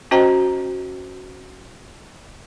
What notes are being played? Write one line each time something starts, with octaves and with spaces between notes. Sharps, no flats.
C#4 F#4 C5 D#5 G5 A#5